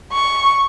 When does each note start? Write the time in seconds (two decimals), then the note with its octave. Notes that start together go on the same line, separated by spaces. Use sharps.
0.13 C#6